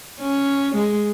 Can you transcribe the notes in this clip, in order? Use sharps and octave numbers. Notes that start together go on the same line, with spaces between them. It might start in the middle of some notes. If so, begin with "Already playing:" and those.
C#4
G#3